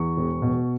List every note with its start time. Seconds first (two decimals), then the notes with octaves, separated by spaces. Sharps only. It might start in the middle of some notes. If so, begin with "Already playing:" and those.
Already playing: E2 C#6
0.17 E1
0.42 B2